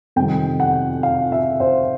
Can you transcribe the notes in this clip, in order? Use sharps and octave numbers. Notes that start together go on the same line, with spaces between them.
F2 C3 D#3 G3 G5
F#5
F5
E5
C5